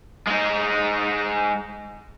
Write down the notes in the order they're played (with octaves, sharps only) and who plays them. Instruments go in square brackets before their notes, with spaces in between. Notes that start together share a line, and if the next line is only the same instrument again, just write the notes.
[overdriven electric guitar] G#3 D#4